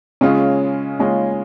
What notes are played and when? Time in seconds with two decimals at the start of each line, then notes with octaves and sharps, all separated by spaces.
0.21 C#3 G#3 C#4 F4
1.00 C#3 G#3 C#4 F4